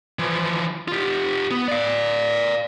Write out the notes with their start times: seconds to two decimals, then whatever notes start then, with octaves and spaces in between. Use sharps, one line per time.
0.19 E3 F3
0.88 F4 G4
1.51 B3
1.68 D5 F5